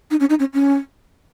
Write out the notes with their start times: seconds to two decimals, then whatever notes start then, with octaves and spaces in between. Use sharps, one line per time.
0.11 D#4
0.20 C#4
0.30 D#4
0.39 C#4
0.54 C#4